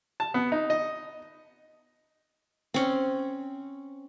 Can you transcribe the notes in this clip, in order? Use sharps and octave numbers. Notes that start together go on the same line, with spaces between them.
A5
B3
D#4
D#5
C4 C#4